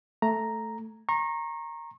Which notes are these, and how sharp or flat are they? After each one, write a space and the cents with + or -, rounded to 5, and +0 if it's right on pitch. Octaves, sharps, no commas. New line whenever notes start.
A3 +0 A#5 +0
A#5 +0 C#6 -35